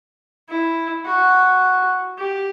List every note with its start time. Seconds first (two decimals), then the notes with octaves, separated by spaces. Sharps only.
0.49 E4
1.05 F#4
2.18 G4